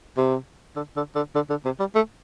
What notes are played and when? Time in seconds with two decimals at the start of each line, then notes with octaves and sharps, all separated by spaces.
0.18 C3
0.76 D3
0.96 D3
1.16 D3
1.35 D3
1.50 D3
1.65 C3
1.80 G3
1.95 A3